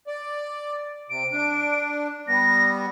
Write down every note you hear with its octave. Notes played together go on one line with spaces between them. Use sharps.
D5
C3 D7
D4
G3 B3 A#6